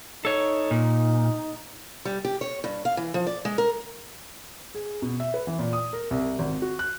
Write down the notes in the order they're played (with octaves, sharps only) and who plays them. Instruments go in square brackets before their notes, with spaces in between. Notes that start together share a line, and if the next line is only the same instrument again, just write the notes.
[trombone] D#4 [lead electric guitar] A4 C#5
[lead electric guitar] A#2
[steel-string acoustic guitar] G3
G4
C#5
G2
F5
E3
F3
D5
G#3
A#4
[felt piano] G#4
B2
E5
B4
E3
A#2
D#6
A#4
C2
G#1
F#4
F#6